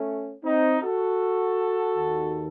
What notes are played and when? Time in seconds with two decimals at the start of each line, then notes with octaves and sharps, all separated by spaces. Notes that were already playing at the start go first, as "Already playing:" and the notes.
Already playing: A3 C#4
0.45 C4 D#4
0.82 F#4 A4
1.96 D#2 D#3